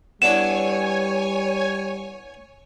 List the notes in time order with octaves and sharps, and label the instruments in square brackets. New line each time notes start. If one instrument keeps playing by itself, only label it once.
[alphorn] G3 [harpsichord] B3 D4 E4 [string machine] C#5 G#5 [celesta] E7